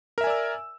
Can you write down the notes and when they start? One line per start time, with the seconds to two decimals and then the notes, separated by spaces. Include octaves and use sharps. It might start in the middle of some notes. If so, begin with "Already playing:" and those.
0.18 A#4
0.21 E5
0.24 G#5
0.27 D5
0.30 E6